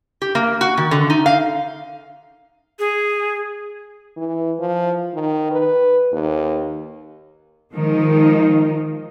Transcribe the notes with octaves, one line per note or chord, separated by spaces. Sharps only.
G4
A#3
F#4
D#3
D3
D#4
F5
G#4
E3
F3
D#3
B4
D#2
D#3 F3 G#3 D#4